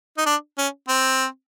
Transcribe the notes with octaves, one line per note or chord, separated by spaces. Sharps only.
D#4
D4
C#4
C4